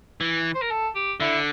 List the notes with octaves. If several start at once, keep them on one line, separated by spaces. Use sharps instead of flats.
E3
C5
A#4
A4
G4
D3 E4